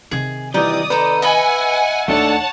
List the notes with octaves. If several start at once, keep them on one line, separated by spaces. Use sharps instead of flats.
C3 D#3 G#4
E3 G3 D#4 D5 D#6
D#4 A4 B4 A#5
D#5 E5 F#5 G#5 B5
D#2 A3 D4 D#4 A4 C#5 F#5 A5